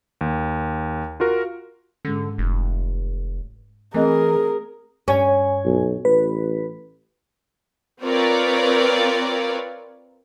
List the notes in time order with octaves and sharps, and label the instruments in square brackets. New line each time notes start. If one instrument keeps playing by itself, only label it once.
[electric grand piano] D#2
F4 F#4 A#4
[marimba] G#2 G#3 C#4 [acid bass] D3
[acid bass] F1
[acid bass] E3 [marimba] A3 C4 D#5 [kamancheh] G#4 A#4
[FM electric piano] G2 G#5 [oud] C#4
[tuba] B1
[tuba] A1 [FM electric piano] B4
[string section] C4 F4 A#4 B4 C#5 D5